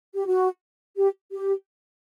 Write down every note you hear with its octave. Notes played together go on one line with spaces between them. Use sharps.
G4
F#4
G4
G4